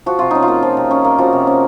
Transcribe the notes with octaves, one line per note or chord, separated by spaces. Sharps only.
F3 F#4
C3 F4
C#4 D#4
F4
A#3
F3
C3
C#4
A#3
F3 F#4
C3
C#4